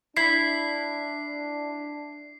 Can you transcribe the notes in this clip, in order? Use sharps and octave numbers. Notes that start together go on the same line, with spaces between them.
D4 E4 B5 B6 C7